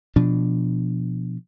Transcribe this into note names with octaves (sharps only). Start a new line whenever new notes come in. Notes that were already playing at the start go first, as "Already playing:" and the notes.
B2 F3 D4